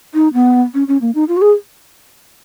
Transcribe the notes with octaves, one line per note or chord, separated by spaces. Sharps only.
D#4
B3
C#4
C#4
A#3
D#4
F4
F#4
G#4